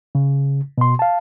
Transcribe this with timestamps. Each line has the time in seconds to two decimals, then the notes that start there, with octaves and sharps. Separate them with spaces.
0.15 C#3
0.78 B2 C6
0.99 F5 A5